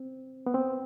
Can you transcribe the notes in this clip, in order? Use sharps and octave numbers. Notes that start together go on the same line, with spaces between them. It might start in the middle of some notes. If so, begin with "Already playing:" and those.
Already playing: C4
B3
C4